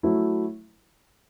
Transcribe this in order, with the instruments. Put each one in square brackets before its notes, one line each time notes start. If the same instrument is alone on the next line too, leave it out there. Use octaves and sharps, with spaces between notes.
[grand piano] F#3 A3 E4